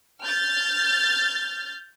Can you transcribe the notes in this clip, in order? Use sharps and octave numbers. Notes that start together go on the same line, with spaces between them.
F6 G6 A6